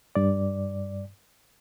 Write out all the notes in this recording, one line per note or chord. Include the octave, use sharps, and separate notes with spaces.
G2 D5